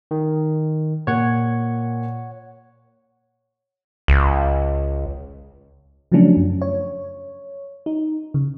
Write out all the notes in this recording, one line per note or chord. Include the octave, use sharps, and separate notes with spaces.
D#3
A#2 C#5 F#5 G#6
C#2
C#3 F3 F#3 A3 C#4 D4
F#2
C#5
D#4
C#3